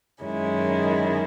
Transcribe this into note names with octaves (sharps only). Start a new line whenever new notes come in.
F#2 D#3 G#3 C#4 E4